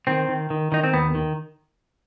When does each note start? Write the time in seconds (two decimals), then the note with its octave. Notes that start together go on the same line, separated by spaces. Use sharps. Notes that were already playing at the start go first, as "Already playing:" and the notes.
0.07 D#3 C4
0.29 D#3
0.50 D#3
0.72 D#3 D#4
0.84 C4
0.93 D#2 B3
1.15 D#3